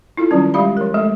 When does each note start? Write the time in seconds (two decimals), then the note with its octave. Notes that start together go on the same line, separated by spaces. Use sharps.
0.17 E4 F4 A4
0.31 D#3 F#3 G3 C#4
0.54 G3 G#3 G4 F5 B5
0.77 F3 A#4
0.94 G#3 A3 A4